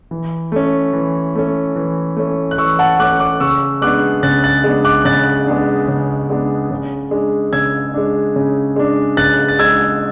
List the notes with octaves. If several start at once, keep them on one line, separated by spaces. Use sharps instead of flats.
E3
A3 C#4
E3
A3 C#4
E3
A3 C#4
F#6
E3 C#6 E6
F#5 A5
A3 C#4 D6 F#6
D6 F#6
C#3 C#6 E6
G#3 B3 D4 D6 F#6
C#3 F#6 A6
F#6 A6
G#3 B3 D4
D6 F#6
C#3 F#6 A6
G#3 B3 D4
C#3
G#3 B3 D4
C#3
G#3 D4
C#3 E6 G#6
G#3 D4
C#3
G#3 D4
C#3 F#6 A6
A6
G#3 D4 E6 G#6